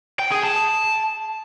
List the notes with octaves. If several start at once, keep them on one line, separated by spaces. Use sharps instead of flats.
G5
G#4
A5